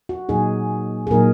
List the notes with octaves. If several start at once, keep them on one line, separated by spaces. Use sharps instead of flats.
F#4
A#2 F#3 D#4 G#4
G#4
A#2 F#3 D#4 A#4